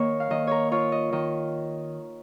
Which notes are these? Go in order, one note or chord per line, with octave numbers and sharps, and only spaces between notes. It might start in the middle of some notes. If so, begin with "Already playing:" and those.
Already playing: D#3 A#3 A#4 C#5 D#5
F5
D#3 D#5
A#4 C#5
F4 C#5
D#5
D#3 D#5